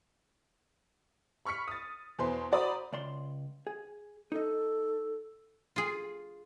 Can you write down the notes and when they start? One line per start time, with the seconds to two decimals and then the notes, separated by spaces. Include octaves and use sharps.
1.45 B5 C#6 F6 B6 C#7
1.68 D#6 A6
2.19 E2 B2 B4 C5 C6
2.52 F#4 C5 D5 A#5 B5 D#6
2.93 C#2 D5 C6
3.67 G#4
4.32 D#4 A4 D#5
5.76 F4 G#4